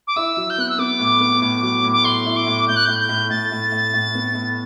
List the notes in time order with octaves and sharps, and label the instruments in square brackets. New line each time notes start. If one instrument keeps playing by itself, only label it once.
[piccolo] D6
[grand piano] E4 [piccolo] E6
[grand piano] F#3
[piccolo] G6
[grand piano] B3 [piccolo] F#6
[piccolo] E6
[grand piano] B3 [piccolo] D6
[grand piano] A2
B3
A2
F#3
A2
[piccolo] D6
[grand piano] A2 [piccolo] C6
[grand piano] E4
[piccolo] D6
[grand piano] A2
[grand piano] A2 [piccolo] G6
[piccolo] F#6
[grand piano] A2 [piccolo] G6
[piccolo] G6
[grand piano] A2
[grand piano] A2 [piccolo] A6
[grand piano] A2
A2
A2
B3
A2